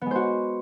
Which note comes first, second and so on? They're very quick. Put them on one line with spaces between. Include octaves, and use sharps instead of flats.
B3 G#3 C5 F#4